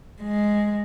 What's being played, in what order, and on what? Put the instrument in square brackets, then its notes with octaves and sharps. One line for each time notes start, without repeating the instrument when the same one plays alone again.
[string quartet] G#3